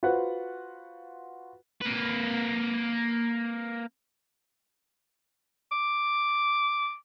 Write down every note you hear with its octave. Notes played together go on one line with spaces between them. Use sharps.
F4 F#4 B4 C5 F#5
A#3 B4
D6